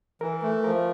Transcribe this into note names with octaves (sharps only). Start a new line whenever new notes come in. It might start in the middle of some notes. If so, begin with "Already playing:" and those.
E3 A#4
A3
F3 A#4